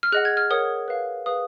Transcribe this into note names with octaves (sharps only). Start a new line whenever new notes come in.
F6
G#4 D#5 F#5 F#6
G#6
F6
A#4 C#5 F#5 D#6
B4 F5
G#4 B4 F5 D#6